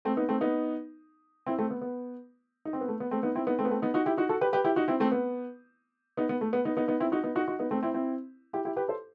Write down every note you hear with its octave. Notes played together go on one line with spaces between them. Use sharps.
A3 C4
B3 D#4
A3 C4
B3 D#4
C4 E4
A3 C4
B3
B3
D#4
C4
B3
A3
B3
A3 C4
B3 D#4
C4 E4
B3 D#4
A3 C4
B3
A3 C4
B3 D#4
D#4 F#4
E4 G4
D#4 F#4
F#4 A4
G4 B4
G4 B4
E4 G4
D#4 F#4
C4 E4
A3 C4
B3
B3 D#4
B3
A3
B3
B3 D#4
B3 D#4
B3 D#4
C4 E4
D#4 F#4
B3 D#4
D#4 F#4
D#4 F#4
B3 D#4
A3 C4
C4 E4
C4 E4
E4 G4
E4 G4
G4 B4
A4 C5